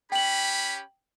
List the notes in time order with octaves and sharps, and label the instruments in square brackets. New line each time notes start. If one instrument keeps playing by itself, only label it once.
[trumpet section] C#4 G4 B5 [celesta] G5 F#7